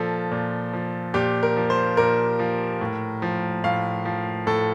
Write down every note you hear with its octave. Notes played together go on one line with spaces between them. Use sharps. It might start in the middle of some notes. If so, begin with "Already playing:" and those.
Already playing: A#2 F3 A4
A#2
F3
A#2 G4
A#4
F3
C5
A#2 A#4
F3
A2
F3
A2 F5
F3
A2 A4